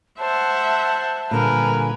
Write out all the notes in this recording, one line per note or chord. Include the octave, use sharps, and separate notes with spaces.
C5 E5 F#5 A5
A#2 D3 G3 A#4 B4 G#5